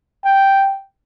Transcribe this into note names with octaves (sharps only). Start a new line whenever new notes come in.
G5